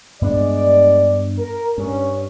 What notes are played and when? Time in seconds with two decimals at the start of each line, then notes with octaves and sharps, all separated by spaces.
0.21 G2 G#3 B3 D4 D5
1.37 A#4
1.78 G2 C#4